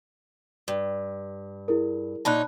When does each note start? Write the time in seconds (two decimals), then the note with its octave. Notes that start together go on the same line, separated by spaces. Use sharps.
0.68 G2
1.68 E4 G#4 A#4
2.25 A#2 D#4 C#5 A5 B5 F#6